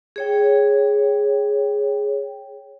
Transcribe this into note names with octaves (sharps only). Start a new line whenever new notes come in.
G#4 C#5 G5